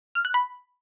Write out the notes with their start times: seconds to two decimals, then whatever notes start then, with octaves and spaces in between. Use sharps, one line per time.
0.15 F6
0.25 F#6
0.34 B5